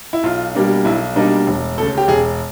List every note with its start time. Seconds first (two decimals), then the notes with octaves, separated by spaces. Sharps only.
0.13 E4
0.23 B1 F4
0.55 B2 G3 A#3 D4
0.85 B1 E4
1.16 B2 G3 A#3 D4 D#4
1.47 E1
1.77 D2 A4
1.82 C#3
1.98 G4
2.08 E1 G#4